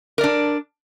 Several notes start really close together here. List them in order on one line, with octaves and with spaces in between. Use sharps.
A#4 D5 D4